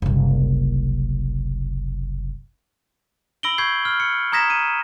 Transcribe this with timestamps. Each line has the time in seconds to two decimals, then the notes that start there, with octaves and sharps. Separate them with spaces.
0.02 F#1 C2
3.43 B5 E6 A#6 D7 F#7 G7
3.58 B5 C#6 G6 G#6 C7
3.85 F6
4.00 C#7
4.32 A#5 D#6 G#6 A#6 B6 E7
4.50 D#7